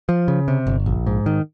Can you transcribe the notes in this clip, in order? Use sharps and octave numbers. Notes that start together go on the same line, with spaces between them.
F3
C#3
C3
G1
A#1
G#2
D#3